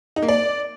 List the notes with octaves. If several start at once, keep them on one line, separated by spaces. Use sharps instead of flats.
D#4
A#3
D5